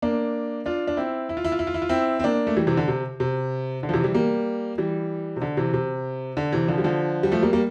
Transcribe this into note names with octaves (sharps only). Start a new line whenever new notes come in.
A#3 D4
D4 F4
D4
C4 E4
E4
F4
E4
F4
E4
F4
E4
F4
C4 E4
C4
A#3 D4
A3
E3 G3
C3 E3
D3
C3
C3
D3
F3
C3 E3
E3 G3
G3 A#3
E3 G3
C3
D3
C3 E3
C3
D3
C3 E3
D3 F3
G3
D3 F3
G3
F3 A3
G3 A#3
G3 A#3